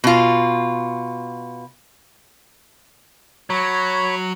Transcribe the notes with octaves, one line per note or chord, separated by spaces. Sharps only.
B2 F4
F#3 C#5 B5